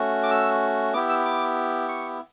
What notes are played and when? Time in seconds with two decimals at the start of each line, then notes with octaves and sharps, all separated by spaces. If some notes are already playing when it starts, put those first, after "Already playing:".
Already playing: A3 C#4 F#4
0.23 D6
0.30 E6
0.94 B3 E4 G4 D6
1.09 E6
1.25 D6
1.89 C#6